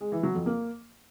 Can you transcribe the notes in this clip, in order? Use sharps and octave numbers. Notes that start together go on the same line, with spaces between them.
G#3
E3
F#3
F2
A#3